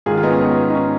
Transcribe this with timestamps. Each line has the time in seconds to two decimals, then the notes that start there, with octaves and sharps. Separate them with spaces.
0.06 G#2 D#3 F4 G#4
0.17 F4
0.23 B3 D#4
0.31 C#4
0.40 B3 D#4
0.70 D#4
0.75 C#4